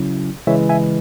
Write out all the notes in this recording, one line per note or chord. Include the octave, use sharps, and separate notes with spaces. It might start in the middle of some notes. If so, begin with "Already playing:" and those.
Already playing: C#3 F#3 C#4 E4
C#3 E3 G#3 C#5 E5
E5 G#5